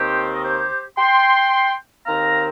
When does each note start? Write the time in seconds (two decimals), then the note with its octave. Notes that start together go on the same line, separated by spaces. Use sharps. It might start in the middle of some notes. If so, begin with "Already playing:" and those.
Already playing: D#2 D#3 C4 G4 C5
0.34 D#5
0.45 G4 C5
0.98 G5 C6
2.07 D#2 D#3 C4 F5 A#5